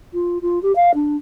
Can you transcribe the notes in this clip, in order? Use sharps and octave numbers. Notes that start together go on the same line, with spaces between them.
F4
F4
G4
F5
D4